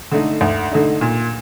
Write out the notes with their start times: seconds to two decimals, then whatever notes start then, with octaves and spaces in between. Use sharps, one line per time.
0.12 D3 A3 D#4
0.41 D2
0.72 D3 A3 D#4
1.01 A#2